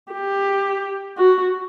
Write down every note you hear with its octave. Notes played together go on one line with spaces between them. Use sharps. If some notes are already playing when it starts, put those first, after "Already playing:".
G4
F#4